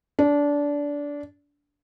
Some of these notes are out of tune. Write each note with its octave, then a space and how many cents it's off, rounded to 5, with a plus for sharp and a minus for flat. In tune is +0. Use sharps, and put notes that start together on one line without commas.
D4 -20